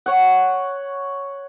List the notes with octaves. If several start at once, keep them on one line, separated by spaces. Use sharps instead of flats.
C#5 F#5